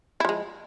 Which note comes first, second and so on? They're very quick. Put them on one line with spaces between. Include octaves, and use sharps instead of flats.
E4 F3 G#3